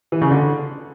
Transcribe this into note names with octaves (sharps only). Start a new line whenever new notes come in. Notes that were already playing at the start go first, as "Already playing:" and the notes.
E3
C#3
D3